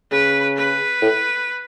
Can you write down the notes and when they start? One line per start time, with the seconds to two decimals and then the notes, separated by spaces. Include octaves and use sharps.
0.11 C#3 B4
0.57 B4
1.02 A2